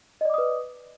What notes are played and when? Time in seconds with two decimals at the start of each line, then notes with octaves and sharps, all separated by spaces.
0.21 D#5
0.25 D5
0.30 D6
0.34 D#6
0.38 B4